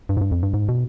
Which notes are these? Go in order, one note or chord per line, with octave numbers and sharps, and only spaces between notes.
G2
G#2
G2
F2
G2
G#2
B2